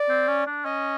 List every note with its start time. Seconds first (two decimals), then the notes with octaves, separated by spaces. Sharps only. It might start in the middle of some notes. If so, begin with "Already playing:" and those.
Already playing: D5
0.09 C4
0.27 C#4
0.46 D4
0.65 C#4 D#5